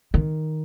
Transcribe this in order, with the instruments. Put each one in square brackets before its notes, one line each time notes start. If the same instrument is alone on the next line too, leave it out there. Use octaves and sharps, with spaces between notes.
[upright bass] D#3